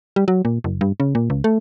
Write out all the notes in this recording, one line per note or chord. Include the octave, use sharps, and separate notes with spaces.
G3
F#3
A#2
F#1
G2
C#3
A#2
C#2
A3